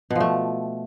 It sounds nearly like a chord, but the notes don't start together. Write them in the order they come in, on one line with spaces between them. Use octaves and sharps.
B2 F3 A3